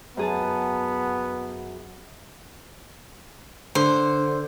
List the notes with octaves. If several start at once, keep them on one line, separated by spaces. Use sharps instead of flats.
F#2 B3 G#4 A5
D3 C5